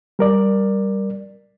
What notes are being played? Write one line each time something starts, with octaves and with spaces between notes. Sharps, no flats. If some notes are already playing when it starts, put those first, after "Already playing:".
G3 A#4 D5